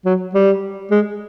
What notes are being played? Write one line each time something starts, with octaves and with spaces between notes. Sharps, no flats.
F#3
G3
G#3